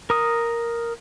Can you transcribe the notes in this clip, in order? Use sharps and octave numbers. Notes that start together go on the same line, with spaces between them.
A#4 D#6